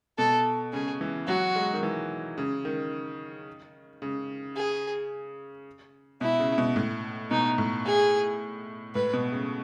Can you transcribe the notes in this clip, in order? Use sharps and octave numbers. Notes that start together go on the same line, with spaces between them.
B2 A4
C#3 G#4
E3
F#3 F#4
G#3
D#3
E3
C#3
D#3
C#3
G#4
B2 E4
C#3
B2
A2
B2 D#4
A2
G#4
A2 B4
B2
C#3